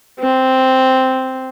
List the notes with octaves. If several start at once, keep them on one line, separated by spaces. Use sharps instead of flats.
C4